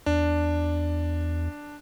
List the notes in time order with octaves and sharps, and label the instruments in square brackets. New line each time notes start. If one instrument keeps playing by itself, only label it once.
[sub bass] E2 [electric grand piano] D4